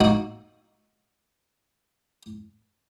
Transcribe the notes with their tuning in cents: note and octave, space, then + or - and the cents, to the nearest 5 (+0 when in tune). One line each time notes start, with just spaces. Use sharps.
A#3 +0 D#4 +0 F#4 -5